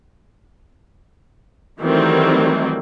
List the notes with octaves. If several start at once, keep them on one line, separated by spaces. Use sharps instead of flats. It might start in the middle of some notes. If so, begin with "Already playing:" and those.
D#3 E3 F#3 G3 A3 C4